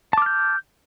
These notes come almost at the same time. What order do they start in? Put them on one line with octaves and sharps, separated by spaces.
A5 D6 F6 G6